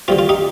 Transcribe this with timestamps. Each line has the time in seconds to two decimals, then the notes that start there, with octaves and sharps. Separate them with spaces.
0.08 D3 G3 C4 F4
0.19 F4
0.29 D#4 G4